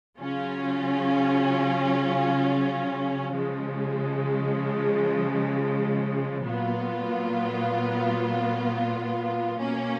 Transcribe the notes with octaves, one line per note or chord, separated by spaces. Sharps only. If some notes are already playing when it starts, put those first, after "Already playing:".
C#3 F#3 C#4 F4
C#3 F3 G#3
A#2 F#3 B3 F4
B2 A#3 C#4